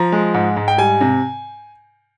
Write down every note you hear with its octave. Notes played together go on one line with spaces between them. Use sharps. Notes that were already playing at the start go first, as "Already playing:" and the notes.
Already playing: F3 A#5
G#3
G#2
G#2
G5
G3 G#5
C3